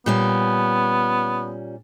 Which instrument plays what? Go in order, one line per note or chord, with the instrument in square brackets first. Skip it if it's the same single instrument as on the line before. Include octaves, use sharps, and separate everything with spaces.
[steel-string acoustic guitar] A#2 G3 C#4 [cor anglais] B3